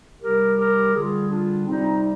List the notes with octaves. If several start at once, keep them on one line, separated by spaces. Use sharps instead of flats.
C3 G3 G4 A#4
G4 A#4
D3 G3 F4 G#4
D4 F4
C3 G3 C4 D#4